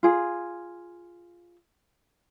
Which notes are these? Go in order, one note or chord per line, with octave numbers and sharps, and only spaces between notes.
F4 G#4